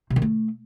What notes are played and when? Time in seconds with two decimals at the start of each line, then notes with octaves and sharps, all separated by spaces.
0.10 C3
0.16 D#3
0.22 A3